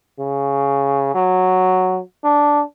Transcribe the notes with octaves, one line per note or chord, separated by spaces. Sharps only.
C#3
F#3
D4